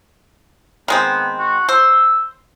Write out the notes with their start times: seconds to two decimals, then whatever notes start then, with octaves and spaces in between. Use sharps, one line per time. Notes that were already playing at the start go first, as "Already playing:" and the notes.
0.88 D#3 G#3 B3 C4
1.39 F#4
1.69 C5 E6